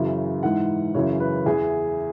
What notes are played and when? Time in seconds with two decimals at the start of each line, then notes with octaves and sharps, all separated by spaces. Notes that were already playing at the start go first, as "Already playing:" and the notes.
Already playing: F#2 C#3 E3
0.43 G#2 E3 F#5
0.95 F#2 C#3 E3 C#5
1.20 B4
1.46 E2 E3 G#4